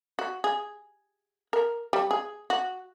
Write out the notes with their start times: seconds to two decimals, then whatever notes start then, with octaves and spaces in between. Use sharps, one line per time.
0.19 F#4
0.44 G#4
1.53 A#4
1.93 G3
2.11 G#4
2.50 F#4